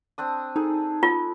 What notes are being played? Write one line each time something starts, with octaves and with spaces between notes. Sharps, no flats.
C4 D4 D#6
D#4 G#4 A4
F4